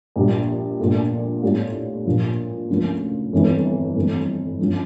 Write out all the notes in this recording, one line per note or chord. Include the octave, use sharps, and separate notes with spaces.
A#1 A#2 G3
A#1 A#2 A3 D4
A2 G3 D4 F4
A#1 A#2 F3
D2 C#3 F3 A#3
G1 F2 E3
G1 F2 E3 A3
G1 D3 F3 C#4